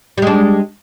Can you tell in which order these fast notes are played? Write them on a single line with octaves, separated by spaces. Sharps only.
G3 G#3 D4